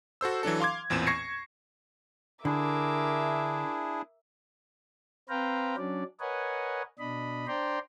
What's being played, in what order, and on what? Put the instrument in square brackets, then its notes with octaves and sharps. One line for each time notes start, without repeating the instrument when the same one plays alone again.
[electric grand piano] F#4 A4 C5 E6
E3 F#3 D4 A4
F5 C6 D6 G#6
A1 E2 A#2 C4 E7
C#6 G#6 A#6 C7 C#7
[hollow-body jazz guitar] D3 [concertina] D4 E4 G#4 [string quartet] A#4 E5 D6
[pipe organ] C4 B4 C5 F5 G5 A#5
F#3 C#4 D4 D5
A#4 B4 C#5 D#5 F#5 G#5
B2 D4 D#5 B5
D4 C5 D5 G5 A#5 C6